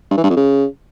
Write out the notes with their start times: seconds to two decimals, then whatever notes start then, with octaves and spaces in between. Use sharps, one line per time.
0.11 G2
0.17 E3
0.24 G2
0.30 F2
0.36 C#3